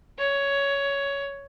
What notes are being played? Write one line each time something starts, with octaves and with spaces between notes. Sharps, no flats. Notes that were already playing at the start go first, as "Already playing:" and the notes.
C#5